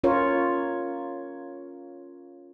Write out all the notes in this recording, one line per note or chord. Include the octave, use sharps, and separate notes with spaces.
C#4 F4 A#4 C#5